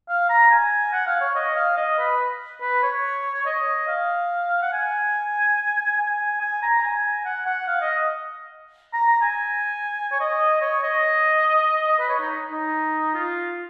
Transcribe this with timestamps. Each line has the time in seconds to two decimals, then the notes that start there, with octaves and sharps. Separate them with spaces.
0.09 F5
0.30 A#5
0.51 G#5
0.93 F#5
1.07 F5
1.21 C#5
1.35 D#5
1.56 F5
1.77 D#5
1.99 B4
2.62 B4
2.83 C#5
3.46 D#5
3.88 F5
4.62 F#5
4.73 G#5
5.98 G#5
6.41 G#5
6.62 A#5
6.78 A#5
6.83 G#5
7.25 F#5
7.46 F#5
7.68 F5
7.81 D#5
8.93 A#5
9.08 A#5
9.22 G#5
10.12 C#5
10.20 D#5
10.62 C#5
10.83 D#5
11.88 D#5
11.99 B4
12.09 C#5
12.20 D#4
12.52 D#4
13.14 F4